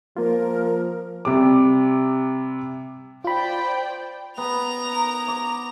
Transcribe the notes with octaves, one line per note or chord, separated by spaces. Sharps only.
F3 A#3 F4 A#4
C3 G3 D6
F4 C5 D5 G5 B5
B3 A#5 F7
D#4 A#4 C#5
D6